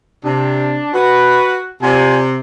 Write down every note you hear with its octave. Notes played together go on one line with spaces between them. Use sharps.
C3 D4
F#4 B4
C3 F4 D5 G#5